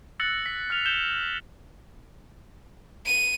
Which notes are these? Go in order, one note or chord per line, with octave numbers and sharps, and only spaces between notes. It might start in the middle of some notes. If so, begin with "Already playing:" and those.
E6 F#6 A6 A#6 C#7 F#7
B6
F6 F#6 F7
G6 E7 G7
D#7